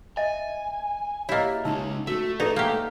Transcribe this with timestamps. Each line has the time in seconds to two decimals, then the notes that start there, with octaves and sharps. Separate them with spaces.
0.17 D#5 E5 G#5
1.29 A#3 E4 G4 C#5 D#5
1.65 C#3 G#3 C#4 D#4 A5 E6
2.07 A3 F#4 E5
2.40 D#4 G#4 A4 B4 D5
2.56 A#3 G4